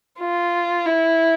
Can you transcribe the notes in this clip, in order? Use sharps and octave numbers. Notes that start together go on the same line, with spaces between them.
F4
E4